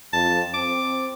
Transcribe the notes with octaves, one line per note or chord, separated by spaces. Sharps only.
F2 A5
C4 D6